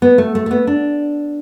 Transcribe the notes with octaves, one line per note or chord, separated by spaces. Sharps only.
B3
A3
A3
A3
B3
D4